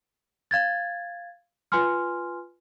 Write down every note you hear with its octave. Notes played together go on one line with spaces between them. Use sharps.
F5 G#6 A6
F4 B4 G#5 C6 F6